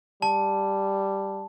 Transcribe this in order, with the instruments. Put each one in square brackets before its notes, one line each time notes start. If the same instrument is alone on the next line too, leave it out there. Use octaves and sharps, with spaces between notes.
[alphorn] G3 [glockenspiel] A5